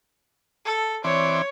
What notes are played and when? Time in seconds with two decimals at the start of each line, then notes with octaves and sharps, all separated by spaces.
0.65 A4
1.04 E3 C4 C#5 D5